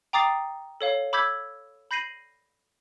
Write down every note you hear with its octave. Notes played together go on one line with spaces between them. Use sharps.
G5 A#5 D6 D#6 A6 C7
A4 C#5 F5
B5 D6 E6 G6 G#6 B6
B5 G6 A#6 C7 D#7 F#7